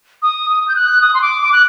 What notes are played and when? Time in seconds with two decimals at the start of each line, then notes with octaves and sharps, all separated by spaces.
0.22 D#6
0.50 D#6
0.68 G6
0.76 F#6
1.01 D#6
1.14 C6
1.22 D6
1.42 D6
1.52 F#6